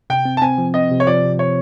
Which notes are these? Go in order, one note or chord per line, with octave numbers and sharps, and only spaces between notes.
C3 G5
C4
A5
C4 G#5
F3
C4 D#5
C3
C#5
F3 D5
C3
C#5